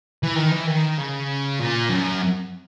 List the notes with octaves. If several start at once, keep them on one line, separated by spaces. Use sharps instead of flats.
E3
D#3
E3
D#3
C#3
A#2
F#2